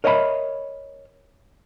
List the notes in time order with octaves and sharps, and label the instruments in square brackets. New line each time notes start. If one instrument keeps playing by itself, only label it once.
[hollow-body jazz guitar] A#4 C#5 D#5 E5 F#5 B5